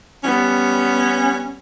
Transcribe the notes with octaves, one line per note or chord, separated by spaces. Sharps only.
G3 B3 C#4